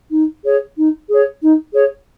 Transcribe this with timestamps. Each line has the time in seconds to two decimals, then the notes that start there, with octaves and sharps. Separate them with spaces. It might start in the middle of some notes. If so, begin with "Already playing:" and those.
0.12 D#4
0.45 G#4 C#5
0.77 D#4
1.09 G#4 C#5
1.42 D#4
1.74 G#4 C#5